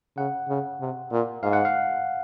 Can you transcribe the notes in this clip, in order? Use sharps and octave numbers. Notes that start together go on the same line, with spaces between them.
C#3 F#5
C#3
C3
A#2
G#2 F5
F#5
F5